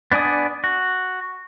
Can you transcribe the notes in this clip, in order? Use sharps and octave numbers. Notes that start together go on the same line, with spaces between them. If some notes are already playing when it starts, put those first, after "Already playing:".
B3 D4 D5 G#5 D#6
F#4